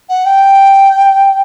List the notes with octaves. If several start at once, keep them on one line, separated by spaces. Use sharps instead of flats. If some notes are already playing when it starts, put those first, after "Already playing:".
F#5
G5